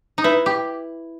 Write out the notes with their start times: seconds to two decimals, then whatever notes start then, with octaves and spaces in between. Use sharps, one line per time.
0.18 D#4
0.24 E4 B4
0.46 G4